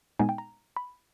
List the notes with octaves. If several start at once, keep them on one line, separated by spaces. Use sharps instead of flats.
A#2 G#3 B3 D#4 G#5
G5
A#5
B5